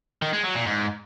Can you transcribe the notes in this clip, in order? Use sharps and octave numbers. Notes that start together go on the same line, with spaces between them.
D#3
G#3
F#3
A#2
G#2